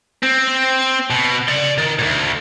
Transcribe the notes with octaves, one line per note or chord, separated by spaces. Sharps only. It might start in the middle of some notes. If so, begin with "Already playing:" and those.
C4
B2
D5 C6
D#3
D2 A#2